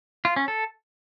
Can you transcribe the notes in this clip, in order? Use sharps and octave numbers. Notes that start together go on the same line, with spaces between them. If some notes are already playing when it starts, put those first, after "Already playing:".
F4
C#4
A4